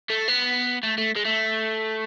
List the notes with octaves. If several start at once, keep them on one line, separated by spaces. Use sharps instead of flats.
A3
B3
A3
A3
G#3
A3